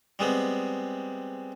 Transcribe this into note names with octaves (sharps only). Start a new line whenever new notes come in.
G3 G#3 B3 C4